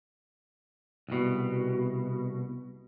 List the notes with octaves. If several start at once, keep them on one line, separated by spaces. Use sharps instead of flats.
C2 B2